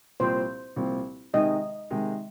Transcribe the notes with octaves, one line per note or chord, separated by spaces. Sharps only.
C2 A#2 F3 C4 C5
C2 A#2 F3 C4
C3 D#3 G#3 D#4 D#5
C3 D#3 G#3 D#4